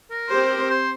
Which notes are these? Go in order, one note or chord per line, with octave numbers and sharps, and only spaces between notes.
A#4
C4 G4 C5
C5